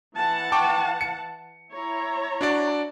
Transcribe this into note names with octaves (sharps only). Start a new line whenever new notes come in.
E3 F#5 A5
G5 C#6 D6
C#7
E4 C#5 A#5
D4 F#4 D5